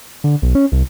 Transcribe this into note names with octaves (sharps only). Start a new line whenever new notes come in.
D3
B1
C#4
C2